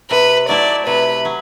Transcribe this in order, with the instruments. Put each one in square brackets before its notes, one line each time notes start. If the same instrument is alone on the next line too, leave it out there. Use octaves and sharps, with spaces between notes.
[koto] C3 [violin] B4
[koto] F#3 A3 E4 [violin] D5
[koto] C3 [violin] B4
[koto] F#3